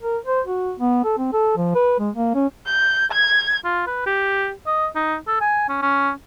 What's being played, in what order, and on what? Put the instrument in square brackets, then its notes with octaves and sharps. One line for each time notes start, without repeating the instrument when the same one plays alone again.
[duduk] A#4
C5
F#4
B3
A4
C4
A4
F3
B4
G#3
A#3
C#4
[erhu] G6
G#6
[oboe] F4
B4
G4
D#5
D#4
A4
G#5
C#4
C#4